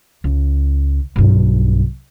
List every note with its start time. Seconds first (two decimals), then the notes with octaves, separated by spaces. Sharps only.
0.24 C#2
1.16 B1 G2